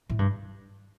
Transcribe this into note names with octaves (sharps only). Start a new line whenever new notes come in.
A2
G2